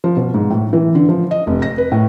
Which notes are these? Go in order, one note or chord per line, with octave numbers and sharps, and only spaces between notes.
F3
B2
G#2
A2
E3
D3
F3
D#5
F1
A#6
B4
A2